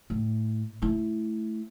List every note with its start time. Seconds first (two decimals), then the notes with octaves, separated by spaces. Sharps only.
0.10 A2
0.82 A3 E4